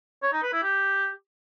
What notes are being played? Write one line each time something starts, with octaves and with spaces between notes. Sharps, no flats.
C#5
D#4
B4
E4
G4